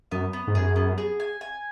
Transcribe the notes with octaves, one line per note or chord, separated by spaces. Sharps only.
F#2 B3
B3
G#2
F#2 G#4
B3
G#4
G#5
G#5